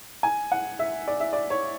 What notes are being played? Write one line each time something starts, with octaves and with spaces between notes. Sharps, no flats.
G#5
F#5
E5
D5
E5
D5
C#5